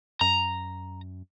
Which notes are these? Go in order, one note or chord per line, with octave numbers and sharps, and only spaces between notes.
F#2 A#5